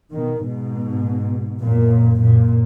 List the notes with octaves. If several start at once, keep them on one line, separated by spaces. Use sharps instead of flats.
B2 D#3
G#2 B2
F#2 A#2
F#2 A#2